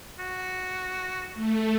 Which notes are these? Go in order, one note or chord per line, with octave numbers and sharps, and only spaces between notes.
F#4
A3